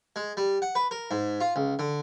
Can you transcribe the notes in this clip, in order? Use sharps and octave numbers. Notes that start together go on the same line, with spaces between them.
G#3
G3
F#5
B4
A#4
G#2
F4
C#2
D3